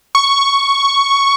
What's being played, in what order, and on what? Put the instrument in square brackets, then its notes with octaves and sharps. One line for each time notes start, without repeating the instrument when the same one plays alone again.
[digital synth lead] C#6